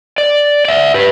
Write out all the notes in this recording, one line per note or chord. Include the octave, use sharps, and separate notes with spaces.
D5
D5 E5
G4 B4